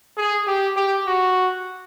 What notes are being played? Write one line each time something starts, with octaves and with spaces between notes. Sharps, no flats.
G#4
G4
G4
F#4